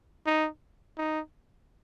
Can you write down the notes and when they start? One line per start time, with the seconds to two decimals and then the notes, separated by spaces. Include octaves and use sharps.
0.26 D#4
0.98 D#4